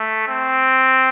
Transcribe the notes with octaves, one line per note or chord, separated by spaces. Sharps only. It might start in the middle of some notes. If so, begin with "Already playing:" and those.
Already playing: A3
C4